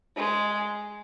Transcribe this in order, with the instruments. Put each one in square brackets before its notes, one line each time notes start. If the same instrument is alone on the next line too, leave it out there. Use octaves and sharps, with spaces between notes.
[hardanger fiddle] G#3